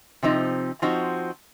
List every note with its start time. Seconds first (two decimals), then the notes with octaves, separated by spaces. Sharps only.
0.23 C3 F3 C4 D#4
0.82 F3 C4 D#4 F#4